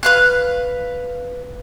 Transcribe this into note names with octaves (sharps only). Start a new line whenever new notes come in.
B4 F5 F#6